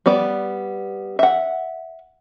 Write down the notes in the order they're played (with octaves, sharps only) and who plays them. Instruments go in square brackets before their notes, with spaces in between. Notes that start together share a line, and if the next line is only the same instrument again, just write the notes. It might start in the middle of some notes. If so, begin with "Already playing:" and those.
[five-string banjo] G3 B3 D5
E5 F#5